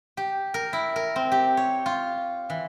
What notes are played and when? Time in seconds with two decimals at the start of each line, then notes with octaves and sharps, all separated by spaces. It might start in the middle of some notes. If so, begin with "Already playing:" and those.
0.17 G4
0.54 A#4
0.73 E4
0.96 A#4
1.16 C4
1.32 G4
1.57 C#5
1.86 F4
2.50 E3